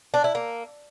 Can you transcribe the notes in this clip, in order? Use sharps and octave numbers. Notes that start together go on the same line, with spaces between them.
D4
E4
A#3